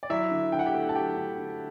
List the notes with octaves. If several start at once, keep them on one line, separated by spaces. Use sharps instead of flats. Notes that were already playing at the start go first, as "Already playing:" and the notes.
D5
F#3 E4 E5
D3
D3 G5
F#5
G4 G5
A3
A5
F#3 G4 G5
D3
D3